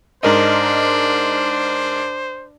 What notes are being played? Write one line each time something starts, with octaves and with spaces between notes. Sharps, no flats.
G#2 D4 A#4 C5 D#5